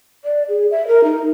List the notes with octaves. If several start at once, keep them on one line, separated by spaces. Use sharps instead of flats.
D5
G#4
E5
A#4
D#4